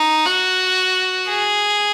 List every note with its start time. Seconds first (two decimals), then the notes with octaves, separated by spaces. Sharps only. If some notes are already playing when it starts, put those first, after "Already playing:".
Already playing: D#4
0.26 F#4
1.29 G#4